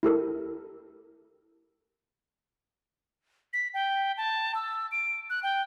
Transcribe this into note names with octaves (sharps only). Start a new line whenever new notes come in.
E4 G4 A4 A#4
B6
G5
A5
E6
D7
F#6
G5